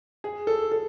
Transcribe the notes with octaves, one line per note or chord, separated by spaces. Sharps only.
G#4
A4
A4